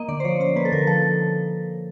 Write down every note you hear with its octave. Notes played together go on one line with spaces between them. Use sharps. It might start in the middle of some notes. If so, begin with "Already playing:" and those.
Already playing: A#3 D#5
D3 D5
C5
F3 C#5
C#4 C5
A#3 B4
A4
D3 A#4
F3 A4